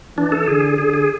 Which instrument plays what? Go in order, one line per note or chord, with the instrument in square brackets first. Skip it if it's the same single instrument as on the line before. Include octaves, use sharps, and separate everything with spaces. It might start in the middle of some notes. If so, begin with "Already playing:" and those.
[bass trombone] E3 [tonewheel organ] D4
[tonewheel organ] A4
[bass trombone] D3 [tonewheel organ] G#4
[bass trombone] D3 [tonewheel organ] G#4
[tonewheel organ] G#4